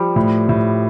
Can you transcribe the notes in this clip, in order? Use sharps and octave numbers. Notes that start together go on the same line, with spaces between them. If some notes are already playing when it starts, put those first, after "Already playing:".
Already playing: F3 G3
A2
A2